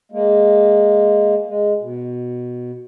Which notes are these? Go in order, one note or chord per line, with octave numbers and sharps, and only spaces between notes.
G#3 A#3
G#3
B2